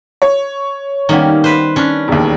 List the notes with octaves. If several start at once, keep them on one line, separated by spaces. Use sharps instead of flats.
C#5
D#3 G3 A#3 B3 C#4
B4 C5
C#4 D4
E1 D#2